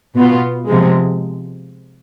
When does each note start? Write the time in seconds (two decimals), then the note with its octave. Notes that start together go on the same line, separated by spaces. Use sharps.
0.15 B2 B3 F4
0.67 C3 F3 G#3